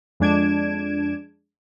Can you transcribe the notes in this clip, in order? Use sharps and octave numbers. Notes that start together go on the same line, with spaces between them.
F2 G#3 D4 G#6 D7 E7